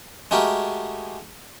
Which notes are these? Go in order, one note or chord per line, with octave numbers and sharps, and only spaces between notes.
G#3 A3 F#4 G4 A#4